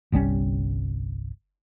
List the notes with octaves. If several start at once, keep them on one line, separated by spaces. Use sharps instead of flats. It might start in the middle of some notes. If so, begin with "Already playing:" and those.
G1 C2 G3 C#4